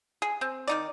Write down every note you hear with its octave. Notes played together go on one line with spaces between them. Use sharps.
G#4
C4
D#3 D#4 D5